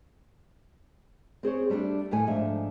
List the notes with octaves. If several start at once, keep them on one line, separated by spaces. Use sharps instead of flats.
C4 G#4 C5 C#5
G3 A3 C#4 D4
D#2 A2 A3 G#5
G#2 F3 A3 D4 E5 F5